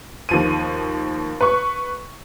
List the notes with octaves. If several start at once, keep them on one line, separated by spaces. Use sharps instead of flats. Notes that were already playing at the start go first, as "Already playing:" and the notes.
D#2 F3 D#7
B4 C#6